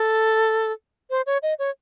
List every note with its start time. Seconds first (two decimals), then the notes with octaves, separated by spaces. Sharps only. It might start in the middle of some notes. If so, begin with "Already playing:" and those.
Already playing: A4
1.10 C5
1.26 C#5
1.43 D#5
1.59 C#5